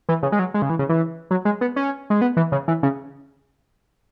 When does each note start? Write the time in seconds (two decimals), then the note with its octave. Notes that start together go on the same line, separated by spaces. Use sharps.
0.09 E3
0.23 C#3
0.32 G#3
0.39 F#3
0.54 G#3
0.62 C#3
0.70 E3
0.79 C#3
0.89 E3
1.31 F#3
1.45 G#3
1.61 B3
1.76 C#4
2.10 G#3
2.21 B3
2.37 E3
2.52 C#3
2.68 E3
2.83 C#3